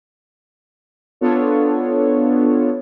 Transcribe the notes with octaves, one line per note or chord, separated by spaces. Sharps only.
B3 D4 F4 A4 C#5